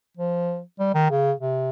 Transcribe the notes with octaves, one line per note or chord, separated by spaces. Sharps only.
F3
G3
D#3
C#3
C3